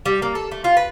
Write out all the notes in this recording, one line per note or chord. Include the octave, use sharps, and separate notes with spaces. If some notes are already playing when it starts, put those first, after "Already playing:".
G3
A#3
A4
A3
F4
B4